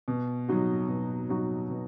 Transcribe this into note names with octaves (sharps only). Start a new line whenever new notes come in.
B2
F#3 D#4 F#4
B2
F#3 D#4 F#4
B2